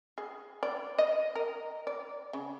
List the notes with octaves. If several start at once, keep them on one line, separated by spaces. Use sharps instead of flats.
G#4
D5
D#5
A#4
D5
C#3